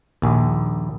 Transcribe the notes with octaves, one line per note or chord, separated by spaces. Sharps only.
A#1 D#2